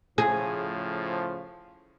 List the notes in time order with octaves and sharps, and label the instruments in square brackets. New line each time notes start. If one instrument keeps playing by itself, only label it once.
[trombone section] A2 C#3 F3 [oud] G#4